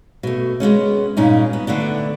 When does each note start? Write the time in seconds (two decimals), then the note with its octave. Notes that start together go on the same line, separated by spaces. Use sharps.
0.23 B2 A3
0.60 G#3 A3 B3 C#4
1.17 G2 A#2 C#4 D#4
1.53 B3
1.67 D3 A3 B3 D4